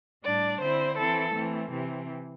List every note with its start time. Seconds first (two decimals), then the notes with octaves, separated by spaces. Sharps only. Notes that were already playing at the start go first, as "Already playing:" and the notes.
0.23 A2 G3 D4 D5
0.60 D3 C4 E4 C5
0.97 E3 C4 E4 A4
1.34 E3 A3 C4
1.71 C3 E3 C4